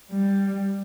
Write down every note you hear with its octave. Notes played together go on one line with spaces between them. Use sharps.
G3